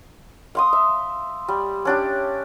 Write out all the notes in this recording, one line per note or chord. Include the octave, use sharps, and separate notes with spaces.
F5 C6 D#6
E5
G3
C#4 D4 G4